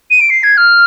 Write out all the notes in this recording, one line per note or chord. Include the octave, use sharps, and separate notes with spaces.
D#7
D7
C7
G#6
F6